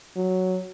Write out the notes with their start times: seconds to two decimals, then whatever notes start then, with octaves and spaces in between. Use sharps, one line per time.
0.16 F#3